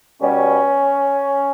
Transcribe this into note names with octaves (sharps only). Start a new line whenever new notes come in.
B2 G3 C#4